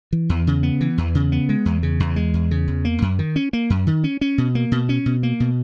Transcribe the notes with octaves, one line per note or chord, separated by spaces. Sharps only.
E3
E2
C#3
B3
E3
E2
C#3
B3
G#3
E2
C#3
E2
G#3
E2
C#3
E2
A#3
F#2
D#3
C#4
A#3
F#2
D#3
C#4
C#4
B2
A#3
B2
C#4
B2
A#3
B2